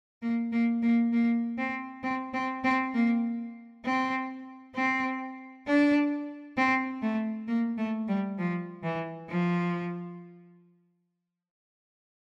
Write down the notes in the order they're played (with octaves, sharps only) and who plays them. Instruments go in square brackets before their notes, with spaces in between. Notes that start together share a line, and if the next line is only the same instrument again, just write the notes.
[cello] A#3
A#3
A#3
A#3
C4
C4
C4
C4
A#3
C4
C4
D4
C4
A3
A#3
A3
G3
F3
E3
F3